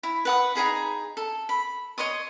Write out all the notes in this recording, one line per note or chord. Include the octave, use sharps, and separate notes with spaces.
E4
B4 F#5 D#6
D#4 E4 G#4 B5
A4
B5
C#5 D#5 C6 D#6